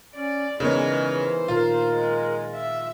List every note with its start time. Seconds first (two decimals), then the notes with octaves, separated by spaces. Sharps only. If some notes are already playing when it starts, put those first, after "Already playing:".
0.15 C#4 D5
0.60 C#3 E3 G#3 B3 D#4 A#4 C#5
1.17 C5
1.48 A#2 D#3 F4 A#4 F5
1.92 G#3
2.54 E5